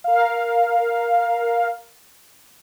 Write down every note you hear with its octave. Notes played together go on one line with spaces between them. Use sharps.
A#4 F5